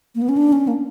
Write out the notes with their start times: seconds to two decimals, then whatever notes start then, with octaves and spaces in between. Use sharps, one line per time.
0.15 A#3
0.22 B3
0.29 C#4
0.37 D4
0.52 C#4
0.68 A#3